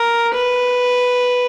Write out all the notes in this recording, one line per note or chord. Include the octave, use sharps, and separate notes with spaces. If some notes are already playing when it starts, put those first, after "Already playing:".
Already playing: A#4
B4